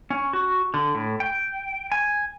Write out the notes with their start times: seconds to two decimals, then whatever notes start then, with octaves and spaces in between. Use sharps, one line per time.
0.10 C#4
0.33 F#4
0.74 D3
0.95 A2
1.20 G5
1.92 G#5